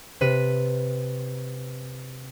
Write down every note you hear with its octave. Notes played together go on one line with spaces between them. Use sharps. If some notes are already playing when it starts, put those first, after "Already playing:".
C3 B4 D#7